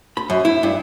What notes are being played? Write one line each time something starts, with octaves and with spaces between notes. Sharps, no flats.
B5
F#2
E4
G2